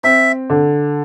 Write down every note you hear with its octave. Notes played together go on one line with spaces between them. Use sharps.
C4 E5
D3